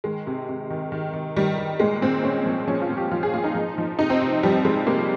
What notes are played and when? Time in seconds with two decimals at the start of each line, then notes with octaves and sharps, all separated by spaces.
0.04 D#3 G#3
0.27 C3
0.49 C3
0.70 D#3
0.92 D#3
1.13 D#3
1.36 D#3 G3
1.58 D#3
1.79 A#2 G#3
2.02 A#2 C4
2.23 A#2 C#4
2.46 F3
2.67 F3 C#4
2.82 F4
2.89 A#2
2.97 G4
3.11 F3 F4
3.23 G#4
3.33 A#2 F4
3.44 D#4
3.55 F3
3.78 F3
3.99 C3 D#4
4.10 C4
4.21 C3
4.43 F3 G3
4.65 F3 G#3
4.87 C3 A#3